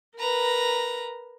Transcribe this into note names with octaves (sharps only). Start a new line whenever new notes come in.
A#4 B4 A#5